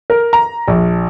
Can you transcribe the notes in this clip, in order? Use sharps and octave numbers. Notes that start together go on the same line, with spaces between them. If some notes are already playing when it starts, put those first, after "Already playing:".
A#4
A#5
A#1